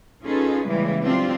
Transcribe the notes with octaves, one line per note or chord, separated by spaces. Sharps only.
C#4 D#4 F4 G#4 A4 B4
C#3 E3 G3 G#3 A#3
F#3 C4 D4 F4 G4